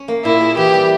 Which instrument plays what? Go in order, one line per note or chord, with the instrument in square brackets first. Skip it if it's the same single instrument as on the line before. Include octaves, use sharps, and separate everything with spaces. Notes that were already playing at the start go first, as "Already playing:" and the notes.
Already playing: [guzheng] C#4
A#3
[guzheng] A#2 [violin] E4
[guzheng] G#4
[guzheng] E3 [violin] G4
[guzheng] G3